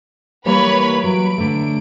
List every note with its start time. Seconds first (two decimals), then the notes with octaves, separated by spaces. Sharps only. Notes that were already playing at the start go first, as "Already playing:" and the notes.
0.45 E3 G3 A#3 B4 C#5 B5
1.04 F#3 D7
1.38 D3 A3